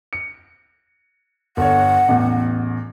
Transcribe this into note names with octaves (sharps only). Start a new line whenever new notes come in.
C#7
G1 C#5 F#5
A1 E2